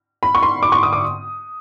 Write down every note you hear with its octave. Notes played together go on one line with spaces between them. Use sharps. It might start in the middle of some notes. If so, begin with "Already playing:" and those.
B5
C#6
C6
D6
C#6
D#6
D6